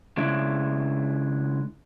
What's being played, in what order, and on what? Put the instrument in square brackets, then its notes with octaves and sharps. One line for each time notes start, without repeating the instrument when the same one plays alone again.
[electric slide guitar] C#3 G#3 D4 E4